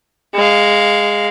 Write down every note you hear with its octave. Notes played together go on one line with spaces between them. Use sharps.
G#3 F5